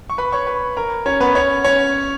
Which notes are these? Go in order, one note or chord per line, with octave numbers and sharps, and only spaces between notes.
C#6
B4 B5
C#5 C#6
B4 B5
A#4 A#5
C#4 C#5
B3 B4
C#4 C#5
C#4 C#5